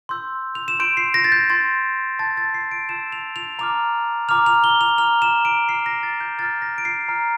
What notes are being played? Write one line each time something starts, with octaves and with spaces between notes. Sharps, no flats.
C6 E6 G6
F7
E7
C6 G6 D7
C7
A#6
A6
G6
C6 G6 A6
A5 E6 G6 A6
A6
C7
D7
A5 E6 G6 E7
F7
F7
A#5 D6 F6 F7
A#5 D6 F6 F7
F7
G7
F7
A#5 F6 F7
E7
D7
A#5 F6 C7
A#6
A6
G6
A#5 F6 A6
A#6
D7
C7
A#5 F6